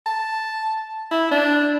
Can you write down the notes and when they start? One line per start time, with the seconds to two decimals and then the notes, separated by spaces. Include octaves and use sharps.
0.06 A5
1.11 E4
1.32 D4